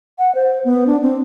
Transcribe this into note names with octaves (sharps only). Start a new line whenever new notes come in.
F#5
C5
B3
D4
C4